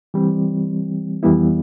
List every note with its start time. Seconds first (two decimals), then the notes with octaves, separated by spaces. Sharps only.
0.14 E3 G3 C4
1.23 F2 E3 G3 B3 E4